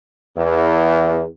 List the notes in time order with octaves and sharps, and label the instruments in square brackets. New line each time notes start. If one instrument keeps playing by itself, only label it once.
[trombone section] E2